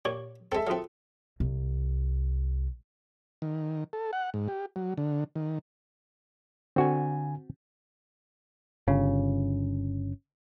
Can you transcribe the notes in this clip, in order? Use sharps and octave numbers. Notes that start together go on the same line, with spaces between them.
A#2 G4 C#5 C#6
G#3 C4 A4 E5
F#3 C4 F4 G#4 A#4
C2
D#3
A4
F#5
G#2
G4
F#3
D3
D#3
D3 C4 F#4 G#5
G1 C#3